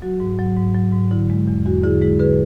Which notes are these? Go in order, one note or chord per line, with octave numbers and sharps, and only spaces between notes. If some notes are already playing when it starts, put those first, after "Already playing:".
F#3 F#4
G#2
F#3
G#2
F#3
G#2
D3 E4
G#3
E2
E2 F#4
D3 E4 G#4
G#3 E4 G#4
D3 G#4 B4